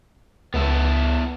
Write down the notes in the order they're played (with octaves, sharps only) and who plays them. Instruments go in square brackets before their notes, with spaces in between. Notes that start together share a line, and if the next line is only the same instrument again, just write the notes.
[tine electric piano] C#2 [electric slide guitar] B3 E4 A4